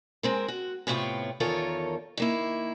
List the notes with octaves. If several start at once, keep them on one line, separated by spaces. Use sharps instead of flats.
G#3 C4 A#4
F#4
A2 C3 B3 F4 C#5 G5
E2 D#3 F4 A4 A#4 C#5
D#3 A#3 E4